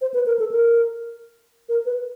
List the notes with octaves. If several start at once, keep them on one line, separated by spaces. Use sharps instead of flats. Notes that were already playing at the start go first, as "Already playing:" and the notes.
C5
B4
A#4
A4
A#4
A#4
B4